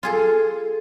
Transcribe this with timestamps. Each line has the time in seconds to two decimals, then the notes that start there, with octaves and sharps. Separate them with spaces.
0.03 F4 G#4 A4